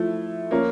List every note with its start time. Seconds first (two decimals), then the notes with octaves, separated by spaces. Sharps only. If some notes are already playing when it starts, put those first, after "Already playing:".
Already playing: F3 A3 E4
0.51 F3 A#3 C#4